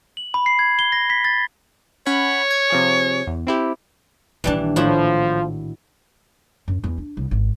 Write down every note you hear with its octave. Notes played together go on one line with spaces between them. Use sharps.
F#7
B5
C7
G#6
G7
A#6
B6
A6
C#4 C#5 F#5 B5
G#6
C3 F3 G#4
E2
C4 E4 G4
A#1 D#3 E3 G3 D4
A2 F3 E4 F#4
F#2
E2
D4
C2
G#1